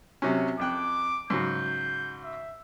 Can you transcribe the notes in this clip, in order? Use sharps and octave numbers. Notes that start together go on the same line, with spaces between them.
C3 F#3 C#4
F2 G5 D6 F#6
G#2 C#3 F#3 G6
E5